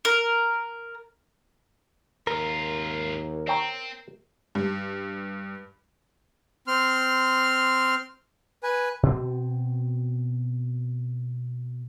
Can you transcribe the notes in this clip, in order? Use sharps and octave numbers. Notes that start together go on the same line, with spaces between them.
A#4
D#2 G#2 F4 A#4
C4 C#5 G5 A#5
G2
C4 C6 F6
B4 G#5
B2 C4